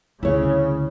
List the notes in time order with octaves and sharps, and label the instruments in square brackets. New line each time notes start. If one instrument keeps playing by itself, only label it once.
[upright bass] D2 [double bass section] C#3 [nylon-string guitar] E4 C#5